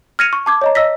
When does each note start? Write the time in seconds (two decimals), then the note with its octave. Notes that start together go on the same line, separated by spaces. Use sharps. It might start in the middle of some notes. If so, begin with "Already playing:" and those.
0.19 F6 G#6 A#6 C#7 D#7 F7
0.33 C#6
0.46 A5 D6 G#6
0.61 C#5 D#5 A#5
0.75 D#5 E6 A#6 B6